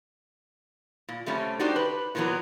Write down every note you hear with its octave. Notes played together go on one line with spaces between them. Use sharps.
A#2
C3 G3 A3 C4 C#4
D4 D#4 F#4 G4 C5 D5
B4
A#2 D#3 E3 F#3 B3 A#4